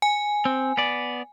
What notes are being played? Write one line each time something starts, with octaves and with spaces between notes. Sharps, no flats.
G#5
C4
B3 D5